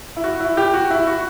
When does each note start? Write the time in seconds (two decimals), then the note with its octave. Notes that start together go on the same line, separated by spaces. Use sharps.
0.17 E4
0.24 F#4
0.40 E4
0.57 G4
0.74 F#4
0.90 E4
1.07 F#4